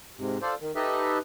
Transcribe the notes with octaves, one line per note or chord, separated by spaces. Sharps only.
G#2 C3
F4 A4 C5 D5
D#3
D#4 G4 A4 B4 D#5 E5